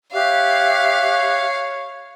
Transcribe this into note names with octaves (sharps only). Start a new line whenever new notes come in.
G4 C#5 E5 F5 F#6